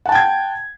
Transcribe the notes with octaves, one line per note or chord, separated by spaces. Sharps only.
F#5 G5 A5 G#6